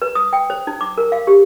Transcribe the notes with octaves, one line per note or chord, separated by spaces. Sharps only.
B4
D#6
G5
C5
D#4
D6
A#4
F5
G4